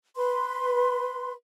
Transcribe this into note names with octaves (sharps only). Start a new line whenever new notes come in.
B4 C6